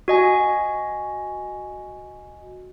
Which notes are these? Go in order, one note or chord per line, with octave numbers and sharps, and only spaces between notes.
F#4 D#5 G#5